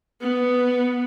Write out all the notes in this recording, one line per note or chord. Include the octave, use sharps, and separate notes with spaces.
B3